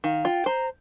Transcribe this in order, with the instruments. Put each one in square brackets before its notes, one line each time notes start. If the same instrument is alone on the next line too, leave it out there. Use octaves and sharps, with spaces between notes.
[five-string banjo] D#3 [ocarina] F5
[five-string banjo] F4 [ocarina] G5
[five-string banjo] C5 [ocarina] A#5